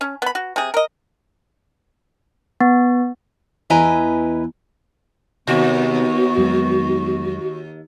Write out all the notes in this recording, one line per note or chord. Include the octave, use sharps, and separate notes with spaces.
C#4
B3 B5
F#4
C3 G#4
A#4 D#5
B3
E2 E4 B4 D#5 G#5 A#5
D#2 C3 B3 F#4
F2 F#3 G#3